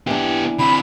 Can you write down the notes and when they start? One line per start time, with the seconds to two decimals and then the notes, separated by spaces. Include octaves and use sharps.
0.07 E3 B3 D4 G4
0.59 D3 C4 B5